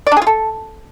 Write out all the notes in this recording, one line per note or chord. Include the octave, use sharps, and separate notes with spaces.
D5
D4
G#4
F4
A4